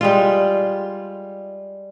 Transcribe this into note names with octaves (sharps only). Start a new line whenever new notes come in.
G3 G#3 F4